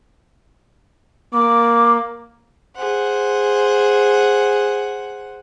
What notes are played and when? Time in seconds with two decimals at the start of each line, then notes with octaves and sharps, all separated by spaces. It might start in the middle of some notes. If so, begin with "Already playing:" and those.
1.33 A#3 D6
2.74 G#4 C5 F#5